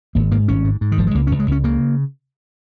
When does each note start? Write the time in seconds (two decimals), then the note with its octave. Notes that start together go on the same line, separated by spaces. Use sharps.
0.15 G#1 A#3
0.31 G#2 A#3
0.48 G#1 C#4
0.64 G#2
0.81 G#2
0.92 D#3
0.98 G#1 F3
1.07 G#3
1.15 C#2 A#3
1.27 C#4
1.32 C#2
1.39 G#3
1.48 C#2 C#4
1.64 C#3 A#3